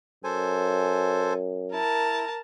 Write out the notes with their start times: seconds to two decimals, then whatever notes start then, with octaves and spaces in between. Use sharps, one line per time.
0.24 F#2 A4 C5 G#5
1.73 E4 A#4 A5